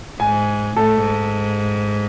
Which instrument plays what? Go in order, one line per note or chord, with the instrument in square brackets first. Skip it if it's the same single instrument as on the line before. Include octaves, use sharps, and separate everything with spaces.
[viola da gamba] G#2 [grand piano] G#5
[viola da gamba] A2 [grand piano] A4
[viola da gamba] G#2